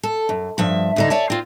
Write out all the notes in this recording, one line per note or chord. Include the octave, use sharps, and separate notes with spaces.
A4
F#2
G2 F3 E5
D2 D3 D#4
C#5 D5 E5 G#5 A5
C4 F4